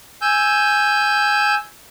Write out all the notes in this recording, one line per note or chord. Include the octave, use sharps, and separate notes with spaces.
G#5 E6 G6